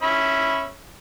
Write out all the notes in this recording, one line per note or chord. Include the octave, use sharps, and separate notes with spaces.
C#4 E5 B5